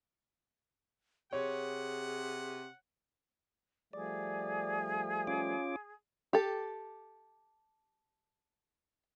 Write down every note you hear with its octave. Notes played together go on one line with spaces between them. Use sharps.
C3 G#4 C#5 F#5
F3 G3 A3 G#4 D5
C#4 F4 D6
G4 A4